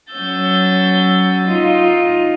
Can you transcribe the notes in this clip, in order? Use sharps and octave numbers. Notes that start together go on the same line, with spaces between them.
F#3 C#4 E6 G6 A6
D#4 F4